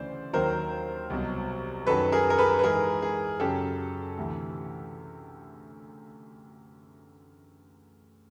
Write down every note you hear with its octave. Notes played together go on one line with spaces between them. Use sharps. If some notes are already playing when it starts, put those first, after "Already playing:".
Already playing: D2 C#3 E3 C5 D5
D#2 D#3 F#3 A#4 C5
C2 B2 F#3
F#2 D#3 F#3 A4 B4
G#4 A#4
A#4
A4 B4
B4
G#2 E3 G#4 A#4
G#4
F#2 C#3 F#3 G4 A4
D2 C3 E3